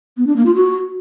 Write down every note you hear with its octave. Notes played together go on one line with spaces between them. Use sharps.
B3
D4
A#3
F4
F#4